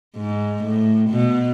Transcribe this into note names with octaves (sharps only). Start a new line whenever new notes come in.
G#2
A2
B2